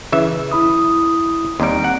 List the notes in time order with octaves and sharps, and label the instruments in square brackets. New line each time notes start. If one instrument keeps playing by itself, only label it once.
[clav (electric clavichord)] C#3 E3 E5
[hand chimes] E4 B5 D#6
[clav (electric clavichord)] D#2 G3 [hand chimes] C4 A#5 D7
[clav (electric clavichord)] F#5